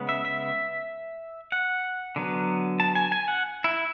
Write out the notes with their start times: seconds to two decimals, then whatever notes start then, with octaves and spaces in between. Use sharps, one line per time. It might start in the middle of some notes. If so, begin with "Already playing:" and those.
Already playing: C#3 G#3 B3
0.09 E5
0.25 E5
1.52 F#5
2.16 D3 F#3 B3
2.80 A5
2.95 G#5
3.12 G#5
3.28 F#5
3.64 E4